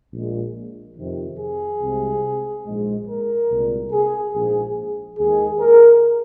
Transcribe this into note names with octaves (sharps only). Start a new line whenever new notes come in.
A#1 A#2 G#3
F2 C3 D#3
G#4
C2 C3 G#3
A#1 G#2 G#3
A#4
C2 A#2 G#3
G#4
A#1 G#2 F3 G#4
D#2 D#3 G#3 G#4
A#4